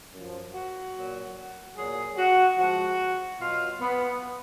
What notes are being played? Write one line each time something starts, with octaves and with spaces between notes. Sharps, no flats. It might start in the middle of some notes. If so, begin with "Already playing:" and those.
F#2 F3
F#4
A#2 F#3
A#2 F#3 G#4
F#4
G#2 F3 F#4
B2 F#3 F4
B3